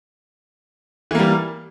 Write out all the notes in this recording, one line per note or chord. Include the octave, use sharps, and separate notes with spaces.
E3 G3 A#3